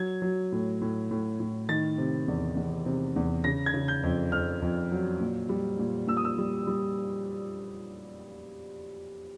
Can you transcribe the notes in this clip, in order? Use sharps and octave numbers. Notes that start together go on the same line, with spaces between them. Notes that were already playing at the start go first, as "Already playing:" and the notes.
Already playing: F#3 G#6
F#3
A2
A2
A2
A2
D#3 A6
C3
E2
E2
C3
E2
C#3 A#6
G#6
C#3
G6
F2
F2 F6
F2
F#3
A#2
G3
A#2
A#2 E6
D#6
E6
G3
G3